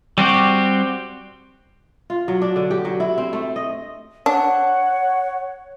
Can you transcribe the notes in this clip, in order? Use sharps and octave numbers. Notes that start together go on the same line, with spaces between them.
G3 C4 F#4 G4
F4
F#3
D4
D3
G4
F#3
E4
C4
A3
D#5
D4 C#5 F#5